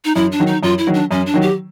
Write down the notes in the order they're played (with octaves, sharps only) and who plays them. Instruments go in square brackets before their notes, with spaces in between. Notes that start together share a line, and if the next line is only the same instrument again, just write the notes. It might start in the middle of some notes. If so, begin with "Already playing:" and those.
[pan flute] D#4
[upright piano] F#2 [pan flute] E4
[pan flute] D4
[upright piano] D#3 F#3
[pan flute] D#4
[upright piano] F#2 [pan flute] F4
[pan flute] E4
[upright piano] D#3 F#3
[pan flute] D4
[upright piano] F#2 [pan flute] C#4
[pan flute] D4
[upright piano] D#3 F#3
[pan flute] G4